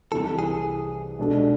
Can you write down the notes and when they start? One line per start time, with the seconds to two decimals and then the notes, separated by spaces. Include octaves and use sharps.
0.12 C2 C3 E3 A4
0.39 G#4
1.19 B2 G#3 D4 A4